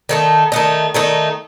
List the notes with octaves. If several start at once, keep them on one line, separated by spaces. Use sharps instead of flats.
D#3 A3 D#4
D#3 A3 D#4
D#3 A3 D#4